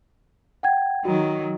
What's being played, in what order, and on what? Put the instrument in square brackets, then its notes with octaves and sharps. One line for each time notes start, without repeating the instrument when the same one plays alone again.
[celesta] F#5 G5 G#6
[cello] D#3 F#3 [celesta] F#4